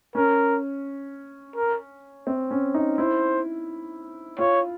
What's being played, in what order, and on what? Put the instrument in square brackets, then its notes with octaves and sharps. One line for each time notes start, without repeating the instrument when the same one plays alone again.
[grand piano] C#4 [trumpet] A#4
[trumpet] A#4
[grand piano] C4
C#4
D#4
[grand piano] E4 [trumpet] C5
[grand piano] F4 [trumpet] C#5